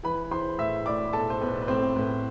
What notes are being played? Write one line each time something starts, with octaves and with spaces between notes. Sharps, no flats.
E3 B4 B5
E3 C5 C6
A2 E5 E6
A2 D5 D6
B1 A4 A5
C5
B1 B4
B4
A2 C4 C5
A2 B4